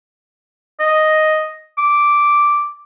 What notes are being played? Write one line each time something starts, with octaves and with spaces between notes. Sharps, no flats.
D#5
D6